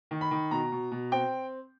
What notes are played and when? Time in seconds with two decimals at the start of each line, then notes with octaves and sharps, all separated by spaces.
0.11 D#3
0.21 B5
0.31 D#3
0.51 B2 A#5
0.72 B2
0.91 B2
1.12 C4 G5